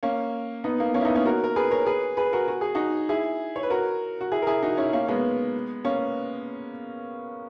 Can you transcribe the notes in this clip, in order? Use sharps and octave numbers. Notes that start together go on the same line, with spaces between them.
A#3 C#4
B3 D#4
A#3
A#3 C#4
E4
B3 D#4
A#3 C#4
F#4 A#4
A#4
G#4 B4
A#4 C#5
G#4 B4
G#4 B4
F#4 A#4
F#4
G#4
D#4 F#4
E4 G#4
C#5
B4
F#4 A#4
F#4
E4 G#4
A#4
E4 G#4
D#4 F#4
C#4 E4
A#3 C#4
G#3 B3
A#3 C#4